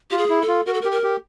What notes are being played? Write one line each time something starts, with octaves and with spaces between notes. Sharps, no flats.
F4 G4
G#4
E4
A4
F4
F#4 A#4
A4
A#4
G4
A#4
G4